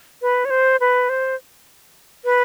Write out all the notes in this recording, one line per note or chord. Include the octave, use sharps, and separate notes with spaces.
B4
C#5
C5
B4
C5
B4